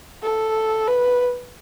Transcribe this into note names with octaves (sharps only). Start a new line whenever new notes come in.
A4
B4